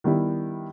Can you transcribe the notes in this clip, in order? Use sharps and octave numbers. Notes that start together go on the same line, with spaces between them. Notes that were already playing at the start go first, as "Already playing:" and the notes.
D#3 G3 B3 E4